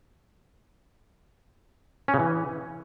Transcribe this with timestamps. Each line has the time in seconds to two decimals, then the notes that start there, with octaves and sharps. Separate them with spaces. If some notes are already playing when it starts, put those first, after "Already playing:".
2.08 C#4
2.14 C#3
2.19 E3